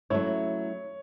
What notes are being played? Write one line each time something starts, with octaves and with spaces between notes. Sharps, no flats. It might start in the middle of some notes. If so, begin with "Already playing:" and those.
F#3 A3 C#4 E4 C#5